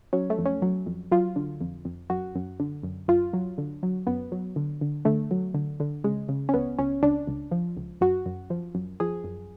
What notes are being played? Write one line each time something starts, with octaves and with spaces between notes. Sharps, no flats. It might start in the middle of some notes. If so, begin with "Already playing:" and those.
F#3 C#4
A3
F2
C#4
F#3
F2
F#3 F4
D3
F2
F2
F#2 F#4
F#2
D3
F#2
F#2 F4
F#3
D3
F#3
F#2 B3
F#3
D3
D3
D3 A3
F#3
D3
D3
C#3 G#3
C#3
C#4
C#2 B3
C#2 C#4
C#2 D4
C#2
F3
C#2
F#2 F#4
F#2
F3
F#2
F3 G#4
F#2